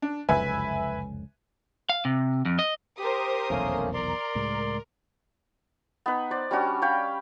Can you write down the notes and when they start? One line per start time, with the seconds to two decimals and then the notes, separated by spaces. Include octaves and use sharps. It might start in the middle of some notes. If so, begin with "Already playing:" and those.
0.02 D4
0.29 F1 C#2 F#2 B4 E5 G#5
1.89 F5
2.05 C3
2.45 F2
2.59 D#5
2.99 G4 A#4 C5 D#6
3.50 F1 B1 E2 A3 A#3 C#4
3.94 A#4 D5 C6
4.35 C#2 A2 G#3
6.06 B3 D#4 B4
6.31 C5 D5
6.51 G3 C#4 D4 F#4
6.82 C#5 F5 G5 B5